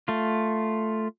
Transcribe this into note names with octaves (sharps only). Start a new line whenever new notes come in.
A3 F4